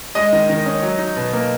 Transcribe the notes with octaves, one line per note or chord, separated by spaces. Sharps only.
G#3 D#5
D#3
D#3
C#4
F#3
D#4
B2
A#3